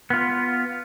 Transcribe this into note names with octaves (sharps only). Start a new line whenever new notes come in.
B3 F4